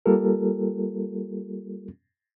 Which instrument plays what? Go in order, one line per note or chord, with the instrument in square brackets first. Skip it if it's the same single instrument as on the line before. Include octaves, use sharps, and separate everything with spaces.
[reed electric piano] G3 A#3 F4 G4 A4 A#4